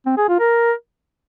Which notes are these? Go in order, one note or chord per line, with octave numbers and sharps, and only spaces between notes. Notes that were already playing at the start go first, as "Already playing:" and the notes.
C4
G#4
F4
A#4